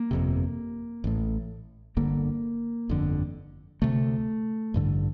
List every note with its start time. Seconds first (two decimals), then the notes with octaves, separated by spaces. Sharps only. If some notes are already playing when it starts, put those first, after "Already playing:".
Already playing: A#3
0.11 G1 F2 C3
1.04 A1 A2
1.97 G1 G2 D3 A#3
2.89 G1 F2 D3
3.82 D2 C3 A3
4.74 A1 G2 D3